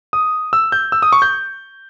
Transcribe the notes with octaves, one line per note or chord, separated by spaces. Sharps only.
D#6
E6
G6
E6
D#6
C#6
G6